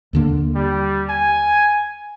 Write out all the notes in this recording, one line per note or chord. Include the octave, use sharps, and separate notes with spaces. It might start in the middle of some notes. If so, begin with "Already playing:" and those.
D#2 D3 A#3
G3
G#5